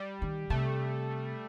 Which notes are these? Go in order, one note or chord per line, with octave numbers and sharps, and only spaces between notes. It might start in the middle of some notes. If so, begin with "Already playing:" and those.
Already playing: G3
D#3
C3 A3